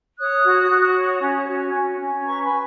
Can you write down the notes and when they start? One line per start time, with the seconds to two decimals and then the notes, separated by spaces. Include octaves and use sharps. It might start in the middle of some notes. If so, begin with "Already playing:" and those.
0.18 C#5 D#6 F#6
0.44 F#4
0.70 F#4
0.95 C#5
1.22 C#4
1.47 F#4
1.73 C#4
1.99 C#4
2.25 B4 A#5 C#6
2.42 G#5 B5
2.50 B4